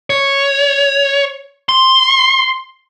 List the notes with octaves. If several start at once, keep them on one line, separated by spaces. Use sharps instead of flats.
C#5
C6